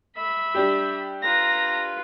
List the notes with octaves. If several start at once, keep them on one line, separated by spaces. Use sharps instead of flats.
E5 B5
G3 D4 G4
F4 B4 A#5 A#6